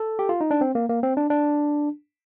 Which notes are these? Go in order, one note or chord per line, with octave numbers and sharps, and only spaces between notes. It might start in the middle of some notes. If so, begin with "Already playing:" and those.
Already playing: A4
G4
F4
D#4
D4
C4
A#3
A#3
C4
D4
D4